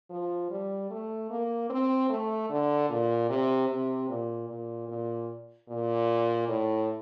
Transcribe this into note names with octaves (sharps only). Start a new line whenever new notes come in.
F3
G3
A3
A#3
C4
A3
D3
A#2
C3
C3
A#2
A#2
A#2
A#2
A2